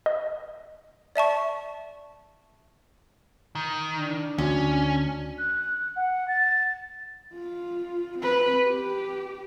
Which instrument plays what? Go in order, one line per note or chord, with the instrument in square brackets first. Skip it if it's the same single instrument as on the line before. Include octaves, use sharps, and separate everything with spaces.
[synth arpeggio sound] D#5
[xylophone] D5 E5 A5 C#6
[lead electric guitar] D#3
[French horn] D4
[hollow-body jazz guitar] D2 [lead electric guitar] C#4
[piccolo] F#6
F#5
A6
[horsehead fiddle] F4
C4 B4
G4